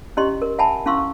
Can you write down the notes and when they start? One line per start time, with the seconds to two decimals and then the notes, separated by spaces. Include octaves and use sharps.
0.17 C#4 E4 G4 D#5 C6
0.42 A#4
0.58 E5 F#5 G#5 A5 B5
0.86 C#4 E4 F5 C6 C#6 E6